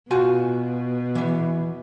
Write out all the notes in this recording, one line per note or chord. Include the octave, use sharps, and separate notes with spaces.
B2 F4 F#4 G#5
E3 B3